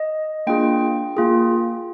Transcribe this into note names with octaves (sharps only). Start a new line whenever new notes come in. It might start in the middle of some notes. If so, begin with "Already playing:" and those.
Already playing: D#5
A#3 D4 F4 G#4 G5
A#3 F4 G#4